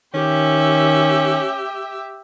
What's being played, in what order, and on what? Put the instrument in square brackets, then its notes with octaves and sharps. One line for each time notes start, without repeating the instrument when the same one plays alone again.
[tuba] D#3 [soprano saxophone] C#4 [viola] G4 E5